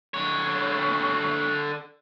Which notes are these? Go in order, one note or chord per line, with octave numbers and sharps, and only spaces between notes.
D3 C#5